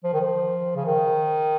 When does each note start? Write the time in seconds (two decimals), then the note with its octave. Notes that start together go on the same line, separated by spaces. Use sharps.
0.04 F3
0.13 D#3
0.21 F3
0.76 C#3
0.85 D#3